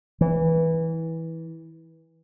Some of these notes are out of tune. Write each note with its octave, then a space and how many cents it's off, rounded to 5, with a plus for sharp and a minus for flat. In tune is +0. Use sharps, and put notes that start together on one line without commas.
E3 -15